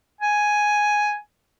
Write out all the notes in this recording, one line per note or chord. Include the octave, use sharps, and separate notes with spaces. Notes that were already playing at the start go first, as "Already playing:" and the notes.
G#5